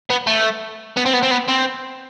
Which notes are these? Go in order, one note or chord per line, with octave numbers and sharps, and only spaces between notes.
B3
A3
B3
C4
B3
C4
B3
C4